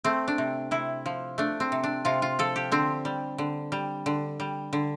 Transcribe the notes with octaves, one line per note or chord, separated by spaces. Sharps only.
A3 C4
D4
C3
C3 E4
F3
A3 D4
C4
C3
D4
C3 F4
F4
F3 A4
G4
D3 C4
G3
D3
G3
D3
G3
D3